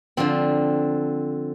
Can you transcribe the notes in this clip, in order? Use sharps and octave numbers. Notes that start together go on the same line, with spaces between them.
D3 F3 C4